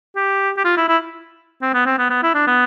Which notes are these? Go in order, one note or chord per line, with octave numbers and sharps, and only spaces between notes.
G4
G4
F4
E4
E4
C4
B3
C4
B3
B3
E4
D4
B3